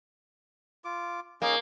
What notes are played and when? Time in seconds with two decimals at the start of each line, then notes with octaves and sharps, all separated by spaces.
0.85 F4 D6
1.42 A#3 C#4 D#4 G#4